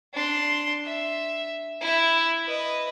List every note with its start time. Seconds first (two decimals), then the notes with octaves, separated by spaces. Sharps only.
0.14 D4 C6
0.85 E5
1.81 E4 E5
2.45 B4 D#5